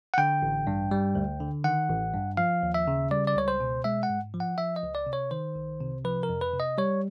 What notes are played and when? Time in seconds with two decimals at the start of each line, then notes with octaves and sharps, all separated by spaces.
0.14 F#5
0.18 D3 G5
0.42 A1
0.67 G2
0.91 G3
1.15 D2
1.40 D3
1.64 D#3 F#5
1.89 A1
2.14 G2
2.37 F3 F5
2.63 D#2
2.74 E5
2.87 C#3
3.11 G3 D5
3.27 D5
3.36 C#2 C#5
3.48 C5
3.60 B2
3.84 G#3 E5
4.03 F#5
4.09 G#2
4.34 F3
4.40 F#5
4.58 F3 E5
4.76 D#5
4.83 C#2
4.95 D5
5.06 C3
5.13 C#5
5.31 D#3 C5
5.55 C2
5.80 C3
6.04 F3 B4
6.23 A#4
6.29 F2
6.41 B4
6.54 C3
6.60 D#5
6.78 G3 C#5